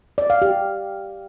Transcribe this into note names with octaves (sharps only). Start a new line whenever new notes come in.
D5
F5
G4